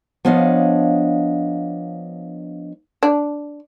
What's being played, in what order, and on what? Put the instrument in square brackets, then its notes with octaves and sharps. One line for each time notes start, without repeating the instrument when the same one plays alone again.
[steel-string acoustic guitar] F3 B3 D4 C#5 D#5 F5
[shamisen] D4